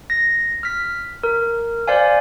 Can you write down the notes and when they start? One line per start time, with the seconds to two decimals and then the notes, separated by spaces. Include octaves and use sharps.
0.10 A#6
0.63 F6 B6
1.23 A#4
1.88 C5 D5 F5 G#5